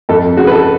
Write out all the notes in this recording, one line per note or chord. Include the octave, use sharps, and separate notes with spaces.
F2 A4
C#3 F#4
B4
A4